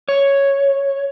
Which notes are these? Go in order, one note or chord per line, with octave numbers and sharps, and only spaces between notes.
C#5